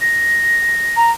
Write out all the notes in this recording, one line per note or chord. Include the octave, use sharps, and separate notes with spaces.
A#6
A#5